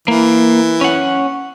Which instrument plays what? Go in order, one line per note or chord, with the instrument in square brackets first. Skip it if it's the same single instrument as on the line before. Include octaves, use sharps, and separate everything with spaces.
[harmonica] E3 [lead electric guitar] A#3
[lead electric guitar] C#4 F#5